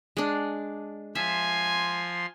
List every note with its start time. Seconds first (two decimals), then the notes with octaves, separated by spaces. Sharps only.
0.17 G#3 D4
1.15 F3 E5 G#5 C6